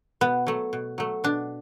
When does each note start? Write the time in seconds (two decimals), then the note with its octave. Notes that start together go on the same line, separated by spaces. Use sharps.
0.21 B2 B3
0.47 F#3 A3
0.73 B2
0.98 F#3 A3
1.24 B2 D4